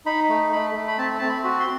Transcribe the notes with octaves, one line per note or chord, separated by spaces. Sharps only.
D#4 B5
A3
A3 B5
A3
B5
C4 A5
C4 A5
B5
F#4
C6